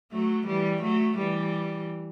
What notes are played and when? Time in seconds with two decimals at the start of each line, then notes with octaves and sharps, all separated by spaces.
0.12 F#3 A3
0.47 E3 G3
0.82 F#3 A3
1.18 E3 G3